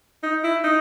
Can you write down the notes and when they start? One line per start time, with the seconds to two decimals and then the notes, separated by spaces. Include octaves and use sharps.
0.23 D#4
0.44 E4
0.64 D#4